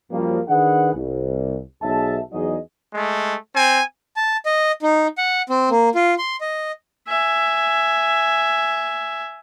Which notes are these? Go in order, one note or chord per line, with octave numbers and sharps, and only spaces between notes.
F#2 F3 G3 A#3
D#3 D4 G#4 B4 F#5
C2
B1 G#4 E5 A5
E2 F#3 D#4 F#4 G#4 D#5
G#3 A3
C4 G#5
A5
D#5
D#4
F#5
C4
A#3
F4
C6
D#5
E5 G#5